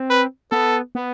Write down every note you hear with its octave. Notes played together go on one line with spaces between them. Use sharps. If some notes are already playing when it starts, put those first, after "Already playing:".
Already playing: C4
B4
B3 A4
B3